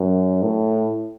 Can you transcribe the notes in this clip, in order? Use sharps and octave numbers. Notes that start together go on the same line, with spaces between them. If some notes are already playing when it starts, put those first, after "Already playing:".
Already playing: F#2
A2